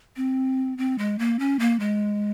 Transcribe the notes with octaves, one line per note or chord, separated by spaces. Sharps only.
C4
C4
G#3
A#3
C#4
A#3
G#3